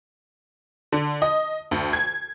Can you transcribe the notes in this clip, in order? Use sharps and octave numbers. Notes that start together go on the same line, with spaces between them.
D3
D#5
D2
G#6